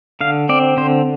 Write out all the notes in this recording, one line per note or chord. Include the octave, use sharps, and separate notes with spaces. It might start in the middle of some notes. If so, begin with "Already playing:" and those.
D3 F5
C4 D5
D3 C5